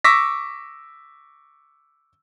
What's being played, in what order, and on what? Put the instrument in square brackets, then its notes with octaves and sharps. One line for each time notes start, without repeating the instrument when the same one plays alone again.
[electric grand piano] C#6 D6 E6 A#6 B6